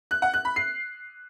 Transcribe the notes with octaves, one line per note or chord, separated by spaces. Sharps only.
F#6
F#5
F#6
B5
C7